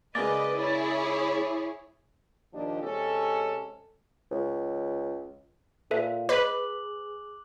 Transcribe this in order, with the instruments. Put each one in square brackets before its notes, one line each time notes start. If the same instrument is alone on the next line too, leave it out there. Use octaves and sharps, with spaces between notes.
[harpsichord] C#2 G#3 A#3 [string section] B4 D#5 [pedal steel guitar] D5
[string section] E4 G#4 C#5
[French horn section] D#2 A#2 F3 D4 G4 D#5
C3 G#3 C#4 G4 A4
[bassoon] C#2
[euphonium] A#2 [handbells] A4 B4 E5
[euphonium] G#4 [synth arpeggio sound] B4 [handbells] D#5 [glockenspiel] D6 F#6 F#7